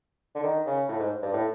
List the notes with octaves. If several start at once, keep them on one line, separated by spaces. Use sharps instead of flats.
D3
D#3
C#3
A2
G#2
G2
A2